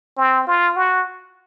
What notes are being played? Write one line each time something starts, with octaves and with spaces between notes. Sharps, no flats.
C4
F4
F#4